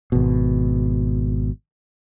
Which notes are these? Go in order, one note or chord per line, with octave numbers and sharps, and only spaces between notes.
G#1 B2